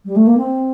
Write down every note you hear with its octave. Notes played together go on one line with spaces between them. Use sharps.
G3
A3
A#3
C4